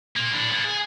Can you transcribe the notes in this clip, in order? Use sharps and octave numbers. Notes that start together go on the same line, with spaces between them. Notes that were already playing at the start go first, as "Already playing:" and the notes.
A#2 A#3
A2 D4
A#3 B3
G#4